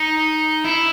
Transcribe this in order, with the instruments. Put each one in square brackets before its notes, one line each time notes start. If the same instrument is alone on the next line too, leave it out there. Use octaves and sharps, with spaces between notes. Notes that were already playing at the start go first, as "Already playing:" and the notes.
Already playing: [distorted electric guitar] D#4
E4